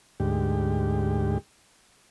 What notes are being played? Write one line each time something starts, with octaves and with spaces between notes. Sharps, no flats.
D2 G#2 G4